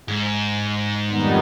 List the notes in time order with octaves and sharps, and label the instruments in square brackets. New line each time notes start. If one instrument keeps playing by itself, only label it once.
[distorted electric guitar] G#2
[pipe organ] F2 D#3 G3 B3 D#4